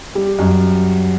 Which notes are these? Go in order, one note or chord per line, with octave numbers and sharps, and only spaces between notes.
G3
F#2